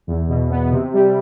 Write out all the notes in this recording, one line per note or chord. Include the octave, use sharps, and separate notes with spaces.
E2
B2
B3
C3
G3